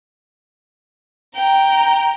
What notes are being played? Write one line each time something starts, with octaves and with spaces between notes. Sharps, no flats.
G5 A#5